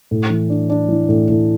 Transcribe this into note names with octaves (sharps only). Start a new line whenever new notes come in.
A2
E3
D4
D4
E3
A2
A2